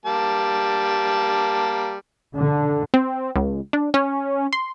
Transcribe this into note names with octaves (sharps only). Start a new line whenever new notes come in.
G3 A#3 A5
D3
C4
C#2
D4
C#4
C6